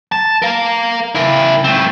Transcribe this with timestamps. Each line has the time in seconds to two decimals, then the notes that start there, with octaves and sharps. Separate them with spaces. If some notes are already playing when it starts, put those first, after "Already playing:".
0.12 A5
0.42 A#4 F5
1.15 E4 A#4
1.65 A3 C4